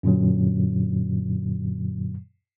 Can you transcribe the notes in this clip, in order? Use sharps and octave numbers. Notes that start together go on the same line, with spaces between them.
F#2 A#2 D3 F#3